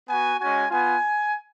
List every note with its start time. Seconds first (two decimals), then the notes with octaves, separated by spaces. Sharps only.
0.09 B3 F#4 G#5
0.40 G#3 C#4 F#4 G#5
0.71 B3 F4 G#5